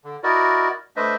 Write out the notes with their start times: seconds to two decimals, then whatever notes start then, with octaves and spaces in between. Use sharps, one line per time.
0.04 D3
0.23 E4 F#4 A#4 D5 D#5
0.96 A3 D4 B4 C5 D#5 E5